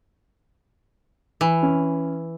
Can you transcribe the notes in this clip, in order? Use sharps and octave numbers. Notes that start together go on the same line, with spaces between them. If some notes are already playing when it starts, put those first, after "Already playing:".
E3
C#4